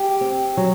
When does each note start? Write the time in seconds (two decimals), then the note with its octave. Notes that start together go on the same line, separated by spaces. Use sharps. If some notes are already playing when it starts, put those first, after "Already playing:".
Already playing: G4
0.21 C4
0.57 F#3